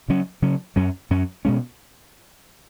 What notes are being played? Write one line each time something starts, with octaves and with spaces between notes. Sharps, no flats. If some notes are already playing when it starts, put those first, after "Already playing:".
C#3 F#3 C#4
C#3 F#3 C#4
F#2 F#3 C#4
F#2 F#3 C#4
B2 G#3 C#4